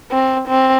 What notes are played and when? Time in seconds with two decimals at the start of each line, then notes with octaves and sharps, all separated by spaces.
0.11 C4
0.48 C4